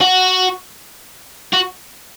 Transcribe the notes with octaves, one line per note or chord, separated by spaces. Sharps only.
F#4
F#4